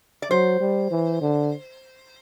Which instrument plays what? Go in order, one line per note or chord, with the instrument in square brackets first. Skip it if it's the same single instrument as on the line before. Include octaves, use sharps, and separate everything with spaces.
[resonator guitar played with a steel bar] D5
[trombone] F#3 [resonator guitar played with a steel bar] C5
[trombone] G3
E3
D3